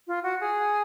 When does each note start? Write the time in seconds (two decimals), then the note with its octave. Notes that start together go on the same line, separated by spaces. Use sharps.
0.07 F4
0.24 F#4
0.41 G#4